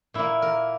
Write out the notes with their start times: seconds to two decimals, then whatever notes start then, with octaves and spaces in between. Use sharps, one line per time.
0.14 A#2 A#3 E4
0.42 A#4